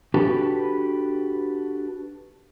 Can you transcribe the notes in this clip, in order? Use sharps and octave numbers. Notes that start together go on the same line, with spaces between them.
D4 F#4 G4 A4 B4